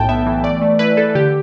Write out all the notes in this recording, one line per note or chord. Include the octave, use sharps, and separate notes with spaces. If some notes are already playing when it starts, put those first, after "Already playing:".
Already playing: B1 A2 G5 A5
B3 E5
E3
A3 D5
A3
E4 B4
E4 A4
D3 G4